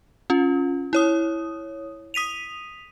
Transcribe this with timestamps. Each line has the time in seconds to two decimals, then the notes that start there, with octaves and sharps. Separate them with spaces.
0.30 C#4 F4
0.93 E4 C#5 D#6
2.14 D#6 B6 D#7 F7